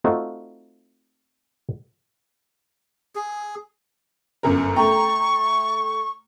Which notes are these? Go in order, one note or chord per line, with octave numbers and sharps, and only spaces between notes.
A3 C4 D#4 F4 F#4
G#4
G1 F#2 A#4
A3 G5 A#5 C#6